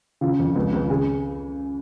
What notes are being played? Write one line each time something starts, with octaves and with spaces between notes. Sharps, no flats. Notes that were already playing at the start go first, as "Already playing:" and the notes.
C#3 F4
F2
C#2
C#2
C#3 G#4